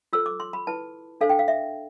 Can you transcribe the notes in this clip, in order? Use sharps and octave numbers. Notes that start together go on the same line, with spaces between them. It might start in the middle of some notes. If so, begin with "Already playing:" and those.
F4 A4 C5 E6
D6
C6
B5
E4 B4 A5
D4 A4 C5 F5
G5
F5
E5